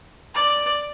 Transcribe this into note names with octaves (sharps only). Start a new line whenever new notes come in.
D5